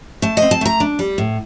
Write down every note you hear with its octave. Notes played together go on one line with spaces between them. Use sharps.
A3 A5
D#5
C4
A5
A3 A#5
D4
G3
A2